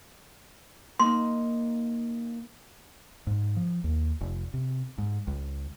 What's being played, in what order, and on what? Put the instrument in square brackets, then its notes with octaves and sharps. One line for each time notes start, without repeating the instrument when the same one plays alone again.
[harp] A#3 D#4 [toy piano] C6
[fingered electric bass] G#2
F3
D#2
F1
C3
G#2
C#2